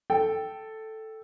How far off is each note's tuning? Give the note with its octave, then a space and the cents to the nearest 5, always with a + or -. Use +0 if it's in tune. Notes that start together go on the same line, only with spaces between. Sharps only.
A4 +0 G5 -10